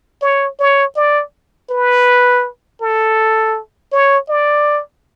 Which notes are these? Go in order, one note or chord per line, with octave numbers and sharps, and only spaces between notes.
C#5
C#5
D5
B4
A4
C#5
D5